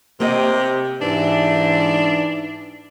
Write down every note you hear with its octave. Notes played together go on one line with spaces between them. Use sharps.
C3 A#3 G4 D#5
G#2 E3 D4